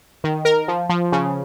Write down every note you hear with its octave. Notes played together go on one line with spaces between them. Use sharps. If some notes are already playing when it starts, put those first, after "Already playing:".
D#3
A#4
F3
F3
C#3